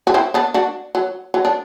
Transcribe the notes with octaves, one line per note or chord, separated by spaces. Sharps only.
F#4
C4 E4
B3 D4
D4 F#4
F#3
F#3
D4